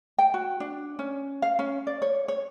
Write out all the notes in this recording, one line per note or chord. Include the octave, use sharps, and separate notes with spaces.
G5
F#4
D4
C#4
F5
C#4
D5
C#5
C#5